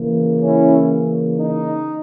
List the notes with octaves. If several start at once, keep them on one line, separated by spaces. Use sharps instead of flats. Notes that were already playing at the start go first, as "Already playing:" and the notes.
Already playing: C#3 E3 A#3
C#4 E4
D#4